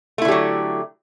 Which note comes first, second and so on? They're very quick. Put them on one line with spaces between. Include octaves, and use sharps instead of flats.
A3 E4 D3 G4 F#3